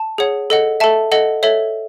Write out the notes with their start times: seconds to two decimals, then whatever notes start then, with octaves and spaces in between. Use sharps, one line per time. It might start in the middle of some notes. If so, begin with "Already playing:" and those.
Already playing: A5
0.18 G#4 C#5 F#5
0.50 A4 D#5 F#5
0.80 A4 E5 A5
1.12 A4 D#5 F#5
1.43 A4 C#5 E5